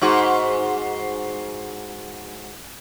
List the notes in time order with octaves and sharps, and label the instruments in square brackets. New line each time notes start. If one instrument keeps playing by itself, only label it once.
[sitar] G#2 F#4